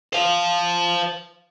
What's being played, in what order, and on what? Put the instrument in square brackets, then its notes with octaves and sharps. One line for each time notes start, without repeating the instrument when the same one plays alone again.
[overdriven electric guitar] C5 F5